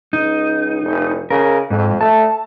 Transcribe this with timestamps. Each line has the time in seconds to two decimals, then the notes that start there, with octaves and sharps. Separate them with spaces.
0.13 C#2 D#4
0.83 F1
1.30 C#3 A#4
1.70 F2 G#2
2.01 A3 A5